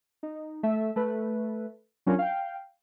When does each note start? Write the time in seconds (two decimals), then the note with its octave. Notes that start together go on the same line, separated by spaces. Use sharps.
0.23 D#4
0.63 A3 E5
0.96 A3 B4
2.06 F#3 C#4 D4 F4 A#4
2.19 F5 G5